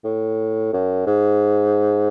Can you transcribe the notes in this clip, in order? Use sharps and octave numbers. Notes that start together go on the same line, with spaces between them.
A2
F#2
G#2